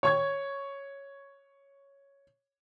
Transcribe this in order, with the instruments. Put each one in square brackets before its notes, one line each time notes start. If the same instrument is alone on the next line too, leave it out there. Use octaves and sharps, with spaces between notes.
[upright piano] C#5 C#6 G#6